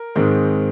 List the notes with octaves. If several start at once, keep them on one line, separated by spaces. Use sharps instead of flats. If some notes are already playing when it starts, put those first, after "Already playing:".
Already playing: A#4
G#2 D#3 G#3 C4